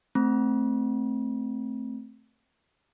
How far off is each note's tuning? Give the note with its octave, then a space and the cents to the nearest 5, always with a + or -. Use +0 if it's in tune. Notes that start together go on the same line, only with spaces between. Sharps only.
A3 +0 C4 +0 B5 -45